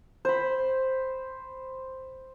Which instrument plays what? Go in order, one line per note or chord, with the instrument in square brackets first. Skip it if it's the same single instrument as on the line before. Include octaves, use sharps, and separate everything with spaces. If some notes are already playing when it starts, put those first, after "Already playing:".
[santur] C5 B5